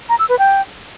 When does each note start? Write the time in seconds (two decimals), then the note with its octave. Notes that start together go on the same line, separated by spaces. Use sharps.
0.09 A#5
0.19 E6
0.29 B4
0.39 G5